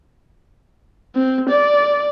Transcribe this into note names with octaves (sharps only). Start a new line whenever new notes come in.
C4
D5